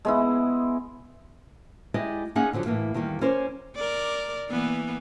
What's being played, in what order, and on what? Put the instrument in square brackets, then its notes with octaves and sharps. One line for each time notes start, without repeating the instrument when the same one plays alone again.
[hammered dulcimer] G#3 B3 E4
[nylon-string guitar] G#3 E4 G4 D5 D#5
A#3 C#4 D#4 G#4 F#5 G#5
D3 F3 F#3 D4
A2 E3 A#3
E2 D#3 G3 A#3
A#3 C#4 A#4 C5 D5
[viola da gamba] A#4 D5
E3 A#3 B3